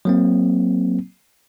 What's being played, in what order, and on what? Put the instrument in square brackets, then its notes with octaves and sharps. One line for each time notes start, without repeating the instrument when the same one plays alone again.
[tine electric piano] F#3 A#3 C4